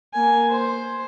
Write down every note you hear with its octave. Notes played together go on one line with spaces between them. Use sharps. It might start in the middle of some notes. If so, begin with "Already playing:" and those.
A#3 G#5
C5